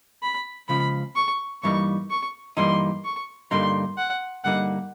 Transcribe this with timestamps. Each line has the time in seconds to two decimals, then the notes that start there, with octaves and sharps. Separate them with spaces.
0.22 B5
0.69 C#2 C#3 F3 B5
1.16 C#6
1.63 G2 E3 G3 A#3 D#4 C#6
2.10 C#6
2.57 G2 E3 G3 A#3 D#4 C6
3.04 C#6
3.51 G2 D3 G3 A#3 D#4 C6
3.98 F#5
4.44 G2 D3 G3 A#3 D#4 F#5